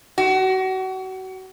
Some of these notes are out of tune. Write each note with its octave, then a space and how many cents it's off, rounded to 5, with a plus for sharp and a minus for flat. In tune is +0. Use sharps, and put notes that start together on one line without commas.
F#4 +30